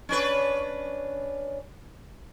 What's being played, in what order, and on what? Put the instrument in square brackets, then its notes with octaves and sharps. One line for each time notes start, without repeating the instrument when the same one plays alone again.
[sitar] C#4 D4 B4